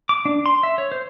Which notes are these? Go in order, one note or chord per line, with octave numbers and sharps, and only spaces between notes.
D6
D4
C6
E5
C#5
C5